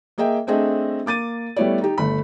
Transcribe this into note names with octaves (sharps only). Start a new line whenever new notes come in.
A#3 G#4 D#5 E5 G5
A3 C4 D4 G#4 D#5 E5
A#3 D6 A6 D#7
G3 A3 B3 E4 C#5 D5
D#4 G4
G1 A3 B5